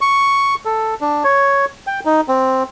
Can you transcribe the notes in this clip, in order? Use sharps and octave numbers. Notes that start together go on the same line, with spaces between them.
C#6
A4
D4
C#5
G5
D#4
C4